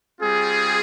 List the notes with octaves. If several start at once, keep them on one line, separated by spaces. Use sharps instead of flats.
G3 C4 F4 G#4